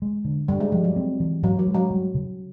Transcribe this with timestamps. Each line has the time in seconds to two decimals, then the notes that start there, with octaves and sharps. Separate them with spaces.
0.02 G#3
0.25 D3
0.48 G2 G3
0.60 G#3
0.72 F3 G3
0.84 F#3
0.96 C4
1.20 E3
1.43 G#2 F#3
1.59 F#3
1.67 G#3
1.74 F#3
1.90 G3
2.14 C#3